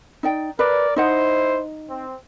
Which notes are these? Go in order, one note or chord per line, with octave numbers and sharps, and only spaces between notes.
D#4 D5 G5
A#4 B4 D5
D#4 E4 C5 D#5 F#5
C4